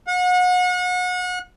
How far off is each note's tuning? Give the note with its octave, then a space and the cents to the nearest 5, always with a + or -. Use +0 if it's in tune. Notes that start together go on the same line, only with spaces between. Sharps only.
F#5 -35